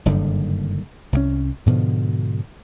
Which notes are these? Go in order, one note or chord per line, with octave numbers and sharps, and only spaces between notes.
F#1 G2 D3 D#3
C2 F3 C#4
G#2 B2 D3 F3